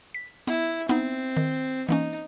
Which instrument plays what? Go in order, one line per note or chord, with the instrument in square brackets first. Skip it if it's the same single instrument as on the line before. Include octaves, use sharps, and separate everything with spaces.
[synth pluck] B6
[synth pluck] B3 [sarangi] E4
[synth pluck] B3 D#4 [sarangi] C4
[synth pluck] D#3
[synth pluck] E3 A#3 C#4 [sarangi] D#4